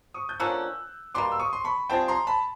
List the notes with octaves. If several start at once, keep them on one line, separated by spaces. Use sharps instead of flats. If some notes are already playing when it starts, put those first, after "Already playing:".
C#6 D#6
G6
D3 F3 A#3 C#4 E6 F#6
B2 G3 A#3 C6 D6
E6
C#6 D#6
C6
B5 C#6
G3 C4 F4 G#4 G5 A5
A#5 C6
A5 B5